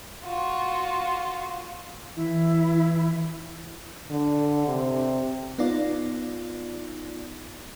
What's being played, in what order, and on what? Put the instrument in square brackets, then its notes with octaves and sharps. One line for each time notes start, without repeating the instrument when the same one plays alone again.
[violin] F4 F#4
[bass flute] E3 [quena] E4
[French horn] D3
C3
[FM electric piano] B3 D#4 F4 D5